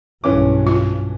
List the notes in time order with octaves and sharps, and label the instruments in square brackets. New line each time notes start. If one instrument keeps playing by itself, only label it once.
[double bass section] B1 G2 [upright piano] E3 C#4 D6
[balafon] F4